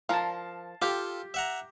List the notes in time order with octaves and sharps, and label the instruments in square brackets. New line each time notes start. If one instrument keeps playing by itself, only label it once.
[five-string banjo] F3 A#4 [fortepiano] F5 A5
[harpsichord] F4 A4 [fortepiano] G4 [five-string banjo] F5 G5
[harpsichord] E5 F#5 A#5